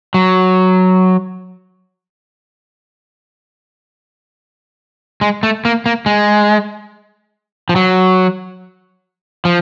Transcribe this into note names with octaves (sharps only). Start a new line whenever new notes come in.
F#3
G#3
A3
A#3
A#3
G#3
F3
F#3
F3